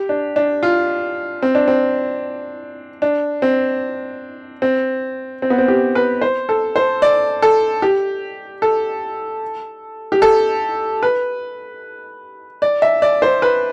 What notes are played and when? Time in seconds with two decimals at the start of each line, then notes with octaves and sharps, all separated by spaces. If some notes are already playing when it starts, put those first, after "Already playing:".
Already playing: G4
0.09 D4
0.36 D4
0.63 F4
1.43 C4
1.55 D4
1.68 C4
3.02 D4
3.42 C4
4.62 C4
5.42 C4
5.50 B3
5.58 C4
5.68 G4
5.95 B4
6.21 C5
6.49 A4
6.76 C5
7.02 D5
7.42 A4
7.82 G4
8.62 A4
10.12 G4
10.22 A4
11.03 B4
12.62 D5
12.82 E5
13.02 D5
13.22 C5
13.42 B4